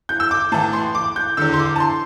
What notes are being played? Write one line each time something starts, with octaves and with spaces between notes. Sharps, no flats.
G6
E6
D6
A2 E3 A5
C6
D6
G6
E2 D3 E6
C6
D6
A5
C6